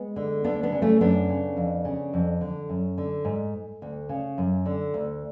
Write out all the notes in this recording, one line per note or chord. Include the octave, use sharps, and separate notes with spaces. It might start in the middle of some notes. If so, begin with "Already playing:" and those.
Already playing: G#3 B3
D3
D2 B3 D4
B3 D4
C#3
A3 C#4
F#2 B3 D4
C#3
F2
C#3
F2
D3
F#2
D3
G#2
D2
C#3
F#2
D3
D2